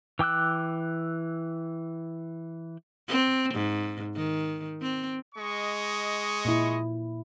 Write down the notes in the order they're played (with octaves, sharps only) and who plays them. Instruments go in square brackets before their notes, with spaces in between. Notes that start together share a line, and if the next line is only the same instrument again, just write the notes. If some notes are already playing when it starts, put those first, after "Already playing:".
[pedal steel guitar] E3 G5 D6 E6 F#6
[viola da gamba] C4
G#2
D#3
C4
[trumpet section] G#3 D#5 C#6
[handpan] A#2 E4